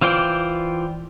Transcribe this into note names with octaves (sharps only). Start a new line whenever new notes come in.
E3 F4 C5 D5 G5